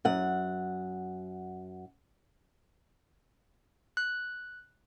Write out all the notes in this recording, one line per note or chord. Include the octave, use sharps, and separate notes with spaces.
F#2 F#5
F#6